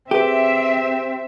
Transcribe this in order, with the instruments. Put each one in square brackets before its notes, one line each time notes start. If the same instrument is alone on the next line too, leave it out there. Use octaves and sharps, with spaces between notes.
[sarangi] C4 [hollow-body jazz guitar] G4 [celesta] G#4 B4 [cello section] E5